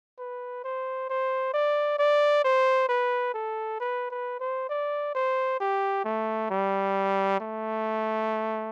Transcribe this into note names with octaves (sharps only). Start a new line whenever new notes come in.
B4
C5
C5
D5
D5
C5
B4
A4
B4
B4
C5
D5
C5
G4
A3
G3
A3